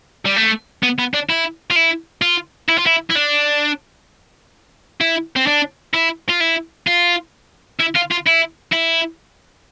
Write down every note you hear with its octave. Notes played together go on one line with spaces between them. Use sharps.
G3
A3
B3
B3
D4
E4
F4
E4
F4
E4
F4
E4
E4
D4
E4
C4
D4
E4
F4
E4
F4
E4
F4
F4
E4
E4